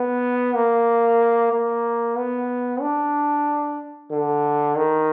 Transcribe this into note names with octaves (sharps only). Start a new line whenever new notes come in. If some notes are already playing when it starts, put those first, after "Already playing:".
Already playing: B3
A#3
A#3
B3
D4
D3
D#3